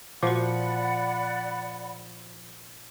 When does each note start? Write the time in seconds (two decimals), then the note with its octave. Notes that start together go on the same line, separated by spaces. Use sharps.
0.23 A#2 F3 F#4 D5 F#5 B5